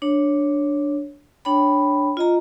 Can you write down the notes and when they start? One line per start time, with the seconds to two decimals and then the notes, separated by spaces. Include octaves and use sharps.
0.02 D4 C#5
1.45 D4 C#5 G5 B5
2.17 F4 D#5 A#5